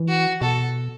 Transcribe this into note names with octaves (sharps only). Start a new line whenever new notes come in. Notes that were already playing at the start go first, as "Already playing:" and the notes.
Already playing: E3
F#4
B2 A4